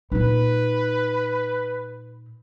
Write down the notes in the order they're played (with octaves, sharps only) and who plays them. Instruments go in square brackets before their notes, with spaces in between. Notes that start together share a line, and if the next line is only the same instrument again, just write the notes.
[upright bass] A#2 D#4 [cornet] B4